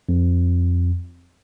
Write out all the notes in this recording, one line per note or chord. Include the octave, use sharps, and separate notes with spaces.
F2